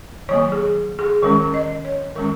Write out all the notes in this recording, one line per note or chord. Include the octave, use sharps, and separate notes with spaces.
D#3 F#3 A#3 C#5
G#4
G#4
D#3 G#3 C#4 A#4
D#5
C#5
D#3 G#3 C#4 A#4